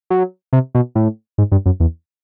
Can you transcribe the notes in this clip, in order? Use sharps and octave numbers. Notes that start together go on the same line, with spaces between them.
F#3
C3
B2
A2
G#2
G2
F#2
E2